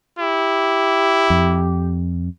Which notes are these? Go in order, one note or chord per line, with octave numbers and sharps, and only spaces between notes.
E4 G4
F2